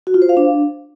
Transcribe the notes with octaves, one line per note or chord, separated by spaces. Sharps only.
F#4
F4
C5
F5
D4